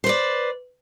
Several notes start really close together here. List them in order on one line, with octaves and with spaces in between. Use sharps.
C5 B4 D5